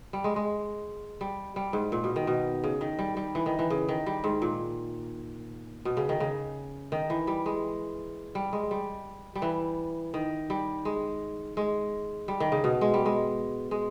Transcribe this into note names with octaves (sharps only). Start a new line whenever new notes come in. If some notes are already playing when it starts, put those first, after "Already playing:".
G3
G#3
G#3
G3
G3
G#2
A#2
B2
D#3
B2
C#3
D#3
G3
G3
E3
D#3
E3
C#3
D#3
G3
G#2
A#2
B2
C#3
D#3
C#3
D#3
E3
G3
G#3
G3
G#3
G3
G3
E3
D#3
G3
G#3
G#3
G3
D#3
C#3
B2
G#3
G3
G#3
G#3